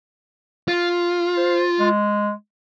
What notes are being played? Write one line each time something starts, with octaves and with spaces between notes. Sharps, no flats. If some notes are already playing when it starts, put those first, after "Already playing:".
F4
C5
G#3